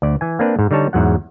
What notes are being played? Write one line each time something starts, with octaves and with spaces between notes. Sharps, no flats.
D2 D5
E3 G#5
A#3 C4 D4 B4
G#2
D3 G3 D#4 C#5 A5
E2 G#2 F#3 F#5